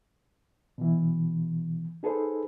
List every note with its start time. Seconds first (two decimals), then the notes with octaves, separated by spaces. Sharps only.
0.78 B2 E3
2.03 D#4 G#4 A4 B4 C5